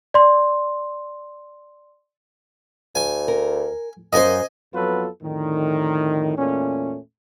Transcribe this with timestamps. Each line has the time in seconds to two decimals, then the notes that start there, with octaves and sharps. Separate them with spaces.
0.14 D5 C6
2.95 D2 G#5
3.28 A#4
4.13 F#2 A#3 A#4 C5 D#5 G#5
4.74 F2 F#3 B3 F4 A4 B4
5.22 F2 A2 D3 D#3
6.38 E2 A#2 A3 C#4